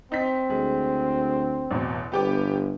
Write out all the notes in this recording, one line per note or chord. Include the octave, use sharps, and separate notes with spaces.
C4 D#4 B6
D2 G#3
A1 E2 B2
G1 B3 G4 D6